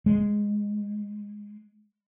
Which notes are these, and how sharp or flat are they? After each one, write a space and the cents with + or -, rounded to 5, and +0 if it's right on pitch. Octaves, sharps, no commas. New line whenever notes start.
G#3 -5